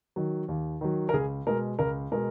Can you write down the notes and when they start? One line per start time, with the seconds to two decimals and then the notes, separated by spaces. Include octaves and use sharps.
0.16 D#3 F#3
0.48 D#2
0.81 D#3 F#3
1.09 A#4
1.14 C#2 G#4
1.47 B2 G#3 A#4
1.79 C#2 A#4
2.12 B2 G#3 A#4